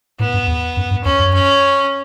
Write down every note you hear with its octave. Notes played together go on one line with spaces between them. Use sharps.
A2 B3
G2
E2
F#2
G2
E2 C#4
F#2
C#4